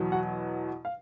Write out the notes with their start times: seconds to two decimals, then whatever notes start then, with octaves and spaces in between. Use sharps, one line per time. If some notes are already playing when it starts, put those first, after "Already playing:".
Already playing: E2 B2 F#3
0.12 F#4 F#5
0.85 F5